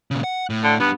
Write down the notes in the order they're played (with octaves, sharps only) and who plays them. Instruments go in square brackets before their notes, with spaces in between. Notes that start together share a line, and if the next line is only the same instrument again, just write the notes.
[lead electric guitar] A#2 C#3
F#5
A2
[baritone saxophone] D3
[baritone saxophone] B3 [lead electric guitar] D4 G4